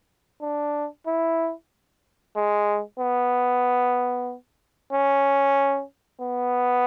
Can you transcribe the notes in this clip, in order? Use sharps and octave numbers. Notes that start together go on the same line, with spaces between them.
D4
E4
G#3
B3
C#4
B3